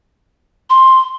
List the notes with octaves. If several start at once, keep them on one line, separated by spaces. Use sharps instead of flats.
C6